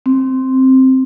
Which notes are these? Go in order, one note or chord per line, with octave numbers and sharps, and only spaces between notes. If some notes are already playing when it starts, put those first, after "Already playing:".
C4